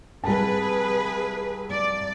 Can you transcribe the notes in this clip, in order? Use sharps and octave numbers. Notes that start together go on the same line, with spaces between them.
C2 G#4 B4 A5
D5